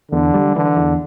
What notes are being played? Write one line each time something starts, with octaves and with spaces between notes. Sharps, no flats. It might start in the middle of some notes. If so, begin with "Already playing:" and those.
E2 D3
G3
D3 E3
E2